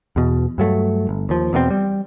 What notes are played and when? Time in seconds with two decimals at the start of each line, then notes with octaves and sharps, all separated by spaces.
0.16 E2 B2
0.58 G2 F#3 A3
1.09 G1
1.29 D#2 F3
1.53 E2 B2 D#3 C4
1.70 G3